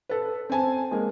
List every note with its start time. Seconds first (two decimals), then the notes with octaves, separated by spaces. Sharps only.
0.09 A4 B4
0.49 C4 C5 G#5 A5
0.91 G#3 A#3